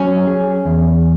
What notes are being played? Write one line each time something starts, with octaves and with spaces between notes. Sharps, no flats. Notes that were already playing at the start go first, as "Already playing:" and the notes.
Already playing: F#3 C#4
G#4
E2